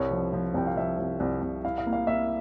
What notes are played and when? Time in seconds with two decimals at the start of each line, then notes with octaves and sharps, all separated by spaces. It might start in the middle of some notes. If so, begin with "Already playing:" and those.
Already playing: C2 C#5
0.11 F3
0.33 F3
0.54 C2 G5
0.67 F5
0.76 F3 E5
0.99 C2
1.20 C2
1.42 C2
1.65 E4 F5
1.78 F5
1.87 A#3
1.93 F5
2.07 A#3 E5